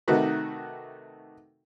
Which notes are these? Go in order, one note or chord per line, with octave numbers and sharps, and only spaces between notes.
C3 D#3 A3 D#4 F#4 B4